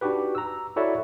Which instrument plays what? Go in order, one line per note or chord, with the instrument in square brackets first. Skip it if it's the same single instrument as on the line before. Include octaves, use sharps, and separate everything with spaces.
[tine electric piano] D4 D#4 F#4 G4 B4
A#5 E6
E4 F#4 A4 C#5 D5 E5